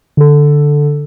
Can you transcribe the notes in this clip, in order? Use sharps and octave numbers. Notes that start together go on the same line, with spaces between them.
D3 A4